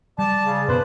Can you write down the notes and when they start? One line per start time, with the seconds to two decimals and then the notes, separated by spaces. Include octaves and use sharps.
0.19 G3 D5 A5
0.45 C#3
0.68 F#2 B2 B3 B4 C5